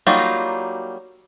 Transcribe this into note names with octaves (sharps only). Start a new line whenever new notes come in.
F#3 G3 A#3 D#4 F4